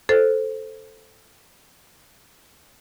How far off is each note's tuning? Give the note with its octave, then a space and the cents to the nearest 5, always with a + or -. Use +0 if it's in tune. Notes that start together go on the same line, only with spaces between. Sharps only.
A4 +0 C5 +0